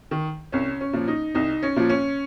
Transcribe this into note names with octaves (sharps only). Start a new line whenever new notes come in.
D#3
C2 C#4
C#4
A#2 F3
D#4
C2 D#4
C#4
A#2 F3
C#4